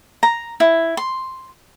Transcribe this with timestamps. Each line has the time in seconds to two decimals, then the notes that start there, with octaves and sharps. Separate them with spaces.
0.23 A#5
0.60 E4
0.97 C6